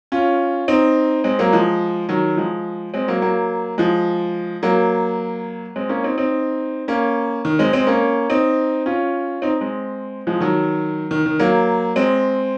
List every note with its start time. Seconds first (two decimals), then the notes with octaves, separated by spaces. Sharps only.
0.12 C#4 F4
0.68 C4 D#4
1.24 G#3 C4
1.39 F#3 A#3
1.52 F3 G#3
2.09 D#3 F#3
2.37 F3 G#3
2.94 G#3 C4
3.08 F#3 A#3
3.22 F#3 A#3
3.78 F3 G#3
4.63 F#3 A#3
5.76 G#3 C4
5.89 A#3 C#4
6.04 C4 D#4
6.18 C4 D#4
6.88 A#3 C#4
7.45 D#3
7.59 G#3 C4
7.73 G#3 C4
7.87 A#3 C#4
8.30 C4 D#4
8.86 C#4 F4
9.42 C4 D#4
9.61 G#3 C4
10.27 F3 G#3
10.40 D#3 F#3
11.11 D#3
11.26 D#3
11.39 F#3 A#3
11.96 G#3 C4